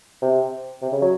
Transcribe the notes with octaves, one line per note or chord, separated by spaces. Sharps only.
C3
C3
C#3
F#3